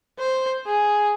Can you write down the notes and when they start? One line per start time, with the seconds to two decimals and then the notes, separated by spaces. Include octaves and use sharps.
0.19 C5
0.67 G#4